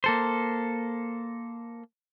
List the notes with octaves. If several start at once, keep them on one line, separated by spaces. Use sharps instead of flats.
A#3 A4 C5